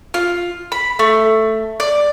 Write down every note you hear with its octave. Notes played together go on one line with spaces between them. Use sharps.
F4
B5
A3
D5